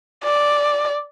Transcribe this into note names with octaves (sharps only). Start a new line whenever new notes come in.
D5